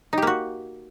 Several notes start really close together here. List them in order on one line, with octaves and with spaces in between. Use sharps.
D#4 G4 A#3 F#4